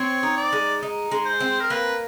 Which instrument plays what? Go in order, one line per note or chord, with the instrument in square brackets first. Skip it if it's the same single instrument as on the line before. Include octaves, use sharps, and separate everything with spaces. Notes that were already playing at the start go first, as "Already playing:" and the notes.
Already playing: [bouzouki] C4 [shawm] C#5
[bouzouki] D#4
[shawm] D5
[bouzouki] G#3
D#4
G#3
[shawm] C5
[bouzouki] C4
[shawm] A#4
[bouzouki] A#3 [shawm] B4